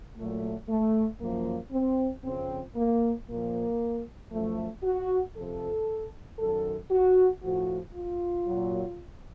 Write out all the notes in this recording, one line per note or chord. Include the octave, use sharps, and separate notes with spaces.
A#2 F#3 A3
A3
F#2 F3 A#3
C4
F2 C#3 F3 C4
A#3
A#2 F3 A#3
F#2 F3 A3
F#4
F2 C3 F3 A4
F#2 D#3 F#3 A4
F#4
A2 F3 F#4
F4
A#2 F#3